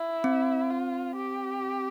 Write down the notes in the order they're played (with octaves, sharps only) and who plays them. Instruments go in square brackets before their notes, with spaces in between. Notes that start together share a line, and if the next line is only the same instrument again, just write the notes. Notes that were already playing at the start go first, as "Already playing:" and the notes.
Already playing: [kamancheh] E4
[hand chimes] C4
[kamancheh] F4
G4